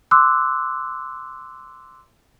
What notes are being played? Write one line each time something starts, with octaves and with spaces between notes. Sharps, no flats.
C6 D6 E6 F#6